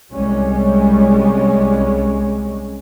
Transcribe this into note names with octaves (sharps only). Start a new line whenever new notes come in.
C2 G3 G#3 C#4